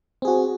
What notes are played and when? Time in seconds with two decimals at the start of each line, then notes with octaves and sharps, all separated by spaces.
0.22 C4
0.25 G#4
0.28 F#4